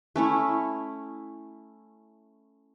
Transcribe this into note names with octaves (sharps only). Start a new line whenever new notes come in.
A3 C#4 E4